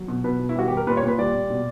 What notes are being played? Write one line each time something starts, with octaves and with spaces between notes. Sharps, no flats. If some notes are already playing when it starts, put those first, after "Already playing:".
Already playing: F#3
B2
B2 B4
B2
E4
G3 F#4
G3 G4
A#4
A#2 B4
C#5
A#2
B4
G3 D5
A#2
B2